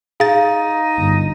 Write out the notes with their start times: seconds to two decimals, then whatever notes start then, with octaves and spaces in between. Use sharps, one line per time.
0.20 D#4 G#4 F5 A6
0.97 G1